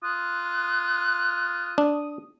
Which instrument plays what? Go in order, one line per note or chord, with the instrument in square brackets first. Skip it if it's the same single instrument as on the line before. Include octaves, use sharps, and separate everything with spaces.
[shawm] F4 [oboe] D#6 [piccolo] F#6
[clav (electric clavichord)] D4